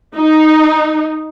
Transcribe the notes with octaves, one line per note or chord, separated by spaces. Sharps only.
D#4